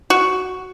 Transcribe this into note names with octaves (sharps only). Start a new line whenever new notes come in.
F#4